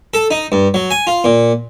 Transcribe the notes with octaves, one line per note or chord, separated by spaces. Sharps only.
A4
D#4
G2
F#3
G#5
F4
A#2